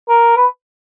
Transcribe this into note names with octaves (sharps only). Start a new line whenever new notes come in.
A#4
B4